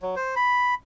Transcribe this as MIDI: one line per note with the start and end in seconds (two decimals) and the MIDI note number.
0.02 0.15 54
0.16 0.35 72
0.36 0.74 83